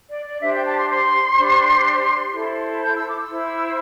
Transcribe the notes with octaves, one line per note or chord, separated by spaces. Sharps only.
D5
D5
D4 G4 C5 E5
G5
A5
C6
C6
D4 G4 C5
E4 A4 C5
G6
E6
D6
E6
E4 C5